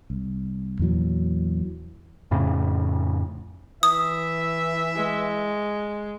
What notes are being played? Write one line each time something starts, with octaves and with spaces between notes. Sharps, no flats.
C2
E2 A#2 E3 F#3
F2 A2 C#3
E3 E5 D#6
G#3